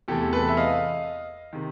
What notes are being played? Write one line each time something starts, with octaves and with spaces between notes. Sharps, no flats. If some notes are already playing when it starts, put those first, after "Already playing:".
E2 C3 E3 A3 G4 A4
A4 B4
E5
D#5 F5
C3 D#3